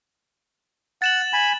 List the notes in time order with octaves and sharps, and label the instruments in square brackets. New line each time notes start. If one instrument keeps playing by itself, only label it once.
[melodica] F#5 [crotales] A6 E7 F#7
[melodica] G#5 B5